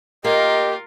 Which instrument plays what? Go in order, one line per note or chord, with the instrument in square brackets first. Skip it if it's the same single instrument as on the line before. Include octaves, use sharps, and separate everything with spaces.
[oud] A#3 [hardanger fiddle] F4 A#4 [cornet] G4 [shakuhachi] D#5